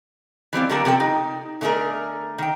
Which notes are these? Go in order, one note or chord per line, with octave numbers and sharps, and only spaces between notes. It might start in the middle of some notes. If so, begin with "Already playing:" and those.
E3 G3 C4 F4
D3 F#3 G3 A#3 A#4 A5
C3 F3 A4 G5
D#4
D3 A3 C4 D#4 G#4 A#4
D#3 G5